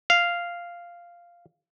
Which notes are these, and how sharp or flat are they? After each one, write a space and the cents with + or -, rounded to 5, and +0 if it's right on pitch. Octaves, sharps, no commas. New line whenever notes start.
F5 -5